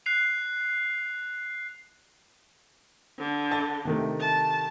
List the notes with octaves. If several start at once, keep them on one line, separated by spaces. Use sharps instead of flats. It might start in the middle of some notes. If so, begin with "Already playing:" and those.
F#6 C7 F7
D3
A5 A6
C3 D#3 A3
A5